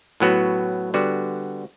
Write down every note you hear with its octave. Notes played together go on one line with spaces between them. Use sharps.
A2 F#3 B3 F#4
D3 G3 B3 F#4